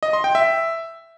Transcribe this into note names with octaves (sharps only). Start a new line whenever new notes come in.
D#5
C6
G5
E5